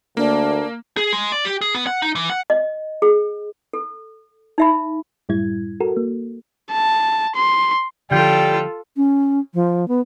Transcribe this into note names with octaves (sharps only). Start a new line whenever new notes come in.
D2 A#3 D4
G#4
G#3
D5
G4
G#4
B3
F#5
D#4
E3
F#5
D#5
G#4
A4
D#4 E5 B5
F#2 A2 G3 E4 G#6
F#4 A4 A#4
A#3
A5
C6
A2 D3 F3 G3 F4 A4 G5
C#4
F3
B3